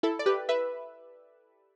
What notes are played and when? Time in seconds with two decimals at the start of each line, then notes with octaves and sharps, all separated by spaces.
0.03 E4 A4
0.19 D5
0.26 G4 B4
0.49 B4 E5